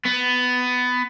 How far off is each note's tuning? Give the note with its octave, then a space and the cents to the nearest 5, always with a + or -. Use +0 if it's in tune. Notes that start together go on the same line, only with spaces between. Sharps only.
B3 +15